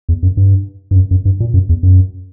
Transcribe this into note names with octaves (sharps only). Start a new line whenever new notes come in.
E2
F#2
G2
G2
F#2
F#2
G2
A#2
F#2
E2
F#2